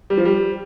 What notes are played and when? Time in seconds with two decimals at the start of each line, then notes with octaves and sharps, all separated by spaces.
0.10 G3
0.18 F3
0.25 G3